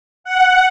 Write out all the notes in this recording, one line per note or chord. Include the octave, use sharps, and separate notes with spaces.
F#5